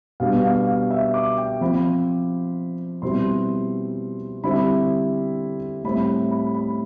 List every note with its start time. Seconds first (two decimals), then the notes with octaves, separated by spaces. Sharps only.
0.20 B2 G3 B3 D4 F5
0.44 F5
0.67 F5
0.91 E5
1.14 D6
1.38 G5
1.61 F3 C4 F4 B5
3.02 B2 G3 C4 E4 C6
4.44 D3 G3 C4 E4 B5
5.84 A2 G3 C4 E4 B5
6.31 B5
6.55 B5